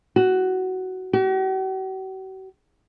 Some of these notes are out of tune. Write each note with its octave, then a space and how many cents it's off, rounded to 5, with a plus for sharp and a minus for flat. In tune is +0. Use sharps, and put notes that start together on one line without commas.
F#4 +10
F#4 +45